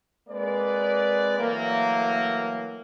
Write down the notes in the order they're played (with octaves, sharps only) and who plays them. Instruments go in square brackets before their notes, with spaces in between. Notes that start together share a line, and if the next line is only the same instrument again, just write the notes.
[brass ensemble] G#3 A#3 C4 B4 D5
E3 F#3 A3 A#3